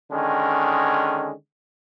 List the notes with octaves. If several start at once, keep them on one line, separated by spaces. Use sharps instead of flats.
D3 D#3 G#3 C#4